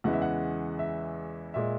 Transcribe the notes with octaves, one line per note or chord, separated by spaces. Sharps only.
E2 C#3 E3 G#3 F#5
E5
F#5
E5
A#2 G#3 E5